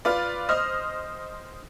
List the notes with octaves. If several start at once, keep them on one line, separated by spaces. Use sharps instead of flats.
F4 B4 D5
C5 D#5 D#6 F6